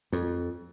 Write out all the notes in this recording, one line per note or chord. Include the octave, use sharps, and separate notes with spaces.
F2